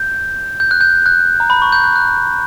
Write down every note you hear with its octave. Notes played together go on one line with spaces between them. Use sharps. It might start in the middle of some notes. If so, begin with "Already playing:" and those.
Already playing: G6
G6
F#6
G6
F#6
A#5
B5
C#6
G6
F#6
F#6